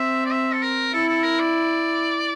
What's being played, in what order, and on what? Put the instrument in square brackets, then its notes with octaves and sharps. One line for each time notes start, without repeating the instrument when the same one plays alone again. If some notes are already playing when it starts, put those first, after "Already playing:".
Already playing: [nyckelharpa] C4 [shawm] E5
[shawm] D5
E5
A4
A#4
[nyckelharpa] E4 [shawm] A4
[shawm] A4
A#4
D5